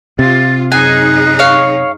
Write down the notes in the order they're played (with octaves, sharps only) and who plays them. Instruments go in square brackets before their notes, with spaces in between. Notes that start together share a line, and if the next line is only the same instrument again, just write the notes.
[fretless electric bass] C3 [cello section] F4 [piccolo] A6
[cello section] F#2 D#4 G#4 [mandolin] G#5 [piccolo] F#6
[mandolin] C#5 F5